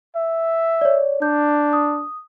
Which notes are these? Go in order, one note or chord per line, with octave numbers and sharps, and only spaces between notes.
E5
C#5 D5
D4 G6
D#6